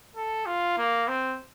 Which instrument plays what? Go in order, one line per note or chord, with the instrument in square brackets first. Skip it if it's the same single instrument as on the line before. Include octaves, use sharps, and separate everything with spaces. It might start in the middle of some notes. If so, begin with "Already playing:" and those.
[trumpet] A4
F4
A#3
C4